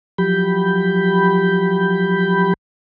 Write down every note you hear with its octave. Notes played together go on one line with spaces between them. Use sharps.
F3 F#3 G4 B5 G6